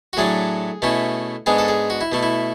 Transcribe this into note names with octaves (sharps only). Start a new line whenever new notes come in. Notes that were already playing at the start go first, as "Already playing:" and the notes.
F#4
A2 F#3 A3 D4 G#4
B2 A3 C#4 E4
G#2 G#3 B3 D4 G#4
A4
G#4
F#4
E4
B2 A3 E4
E4